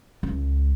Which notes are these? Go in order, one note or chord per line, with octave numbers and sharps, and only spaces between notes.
C#2